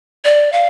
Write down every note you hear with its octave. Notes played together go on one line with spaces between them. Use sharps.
D5
F5